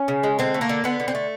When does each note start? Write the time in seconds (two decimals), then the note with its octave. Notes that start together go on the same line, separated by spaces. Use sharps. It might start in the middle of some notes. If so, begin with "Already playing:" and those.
Already playing: C#4
0.08 C#3
0.23 G#3
0.39 D3 C4
0.54 A3
0.61 A#3
0.69 D3
0.84 D3 B3
1.00 D3
1.08 C4
1.15 A3